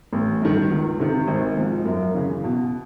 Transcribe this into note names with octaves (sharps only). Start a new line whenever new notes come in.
A1
G2 D#3
C#2
C3 D#3
G#1
G#2 F3
F#2
C#3 E3
B2